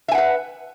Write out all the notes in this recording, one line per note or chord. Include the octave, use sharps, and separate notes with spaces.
B4 E5 F#5 G#5